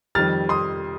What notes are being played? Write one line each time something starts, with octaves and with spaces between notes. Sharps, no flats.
F2 D#3 G3 F6 A6
C6 D#6